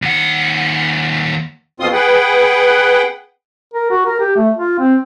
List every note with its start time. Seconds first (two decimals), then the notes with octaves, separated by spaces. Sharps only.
0.02 D#2 F#5
1.80 F2 B2 C4 F4 C6 D#6
1.93 G#4 B4 F#5 G5
3.74 A#4
3.91 F#4
4.06 A#4
4.20 G4
4.36 A3
4.57 F4
4.79 C4